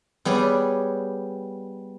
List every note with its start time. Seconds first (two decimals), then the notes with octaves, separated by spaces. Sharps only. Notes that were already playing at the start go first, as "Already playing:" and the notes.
0.25 G3 B3 G#4 C#5 D5